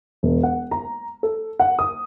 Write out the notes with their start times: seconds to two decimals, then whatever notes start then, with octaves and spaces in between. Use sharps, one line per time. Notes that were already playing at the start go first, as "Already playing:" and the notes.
0.23 E1
0.43 F#5
0.71 A#5
1.23 A4
1.59 F#5
1.79 D#6